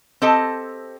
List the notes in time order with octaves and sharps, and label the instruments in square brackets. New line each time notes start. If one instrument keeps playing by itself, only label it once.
[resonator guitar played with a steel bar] C4 G4 A4 D#5 A5